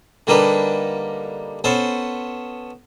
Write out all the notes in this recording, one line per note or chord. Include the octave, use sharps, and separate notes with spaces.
D3 G3 A#3 D4 D#4 B4
B3 C#4 A4 C5